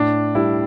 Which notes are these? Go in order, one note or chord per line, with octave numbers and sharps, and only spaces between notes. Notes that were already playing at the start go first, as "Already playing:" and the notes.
Already playing: A2 D4
G3 E4